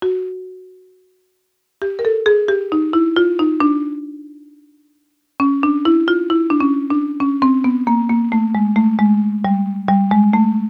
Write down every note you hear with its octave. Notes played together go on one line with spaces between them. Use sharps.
F#4
G4
A#4
A4
G#4
G4
D#4
E4
F4
D#4
D4
C#4
D4
E4
F4
E4
D4
C#4
D4
C#4
C4
B3
A#3
A#3
A3
G#3
A3
G#3
G3
G3
G#3
A3